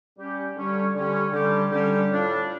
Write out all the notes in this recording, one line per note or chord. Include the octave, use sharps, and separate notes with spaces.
G3 C#4 G4
D3 G3 C#4 G4
D3 G3 C#4 G4
D3 G3 C#4 G4
D3 G3 C#4 G4
A2 G3 D4 F4